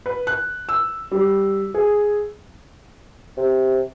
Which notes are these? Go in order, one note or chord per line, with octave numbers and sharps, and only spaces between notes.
B4
F#6
E6
G3
G#4
C3